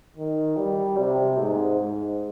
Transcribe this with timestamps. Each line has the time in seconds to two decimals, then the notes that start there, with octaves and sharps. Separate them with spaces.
0.17 D#3
0.57 G3
0.98 C3
1.39 G#2
1.80 G#2